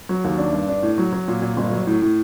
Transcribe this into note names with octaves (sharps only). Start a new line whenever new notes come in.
F#3
D#2
D4
G2
D4
A2
F#3
F#3
A#2
A#2
G1
F#3
A2
A2